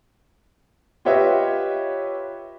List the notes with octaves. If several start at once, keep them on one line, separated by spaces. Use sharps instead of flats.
F4 G4 B4 C#5 D#5 E5